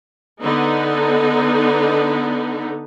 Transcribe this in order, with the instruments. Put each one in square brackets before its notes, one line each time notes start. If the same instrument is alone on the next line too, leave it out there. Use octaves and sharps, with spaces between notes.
[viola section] D3 B3 D#4